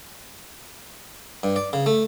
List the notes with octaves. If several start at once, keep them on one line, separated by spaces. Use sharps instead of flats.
G2
D5
C#3
A3